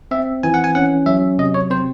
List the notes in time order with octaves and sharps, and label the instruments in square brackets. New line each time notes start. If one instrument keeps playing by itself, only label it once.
[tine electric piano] C4 E5
E3 G#5
F#5
G#5
C#4 F#5
F#3 E5
C3 D#5
C#5
C4 C5